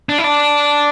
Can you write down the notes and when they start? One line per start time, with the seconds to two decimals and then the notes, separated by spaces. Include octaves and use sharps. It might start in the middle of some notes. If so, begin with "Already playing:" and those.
0.09 D4
0.18 E4
0.24 D4